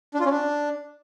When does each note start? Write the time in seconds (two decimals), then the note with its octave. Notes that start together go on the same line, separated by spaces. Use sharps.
0.14 D4
0.20 F4
0.25 C#4
0.31 D4